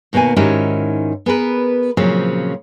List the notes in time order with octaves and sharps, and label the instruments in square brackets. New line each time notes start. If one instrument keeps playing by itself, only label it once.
[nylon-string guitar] D#2 B2 A#3 B3 G#5
G#2 D#3 C#4 E4 F#4 G4
B3 G#4 A#4 B4
A#2 C#3 F3 F#3 C4